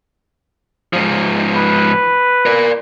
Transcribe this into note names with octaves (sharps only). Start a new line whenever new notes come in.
G#2 F3
B4
A#4 D5